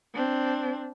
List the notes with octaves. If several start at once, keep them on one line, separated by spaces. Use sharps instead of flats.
C4 D4